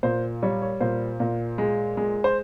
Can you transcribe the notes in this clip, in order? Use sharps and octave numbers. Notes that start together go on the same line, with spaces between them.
A#2 C5
G3 C#5
C#5
A#2 C5
A#2
G#3
G#3
C5